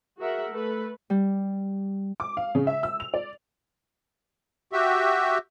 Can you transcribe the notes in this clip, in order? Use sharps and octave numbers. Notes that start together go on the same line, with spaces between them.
F#4 G#4 A#4 E5 F#5
A3 A4 B4
G3
D6
F5
C#3
E5
E6
F7
D5
F#4 G4 E5